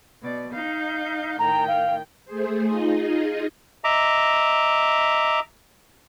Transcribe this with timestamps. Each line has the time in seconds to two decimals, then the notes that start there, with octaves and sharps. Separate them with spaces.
0.21 B2 D5
0.52 D#4 F5 G6
1.39 A2 D#3 G5 A#5
1.68 F5
2.25 A3 G#4 C5
2.66 D#4 F4 G#4 D#5
3.84 D#5 E5 A#5 D6